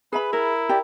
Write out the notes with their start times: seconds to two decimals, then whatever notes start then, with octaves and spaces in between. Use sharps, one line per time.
0.13 G#4 B4 E5 B5
0.33 E4 A#4
0.69 G4 D5